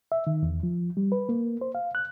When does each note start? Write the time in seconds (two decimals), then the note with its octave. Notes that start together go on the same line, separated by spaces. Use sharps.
0.12 E5
0.27 D#3
0.43 E2
0.63 F3
0.97 G3
1.12 B4
1.29 A#3
1.61 C5
1.75 F5
1.95 F#6